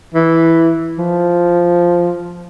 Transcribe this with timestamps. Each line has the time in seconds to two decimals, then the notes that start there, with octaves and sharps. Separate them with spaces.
0.14 E3
0.98 F3